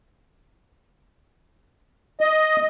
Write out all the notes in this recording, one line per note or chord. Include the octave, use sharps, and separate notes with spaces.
D#5